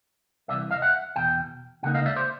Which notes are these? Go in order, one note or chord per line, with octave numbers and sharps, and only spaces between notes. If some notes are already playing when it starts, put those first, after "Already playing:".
C2 C3 E3 D5 E5
D#5 F5
E5 F#5
E2 B2 G5
C#2 C#3 A#3 D#4 F#5
D#5 F5
D5 E5
C5 D5